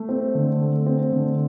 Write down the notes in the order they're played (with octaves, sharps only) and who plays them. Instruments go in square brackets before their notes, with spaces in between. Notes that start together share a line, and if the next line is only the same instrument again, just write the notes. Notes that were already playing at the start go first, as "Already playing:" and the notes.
Already playing: [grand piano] A3
C4
D3
A3
C4
D3